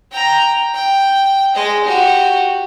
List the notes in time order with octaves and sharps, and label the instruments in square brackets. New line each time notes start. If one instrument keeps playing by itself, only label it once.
[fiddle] G5 A#5
G5
G#3 D#5
F#4 G4